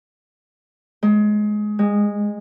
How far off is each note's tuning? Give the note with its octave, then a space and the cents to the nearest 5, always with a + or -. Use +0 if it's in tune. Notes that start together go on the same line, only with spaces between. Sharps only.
G#3 +20
G#3 -20